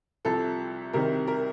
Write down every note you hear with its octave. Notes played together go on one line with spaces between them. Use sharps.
C2 C3 F3 A4
C2 C3 D#3 A#4
A#4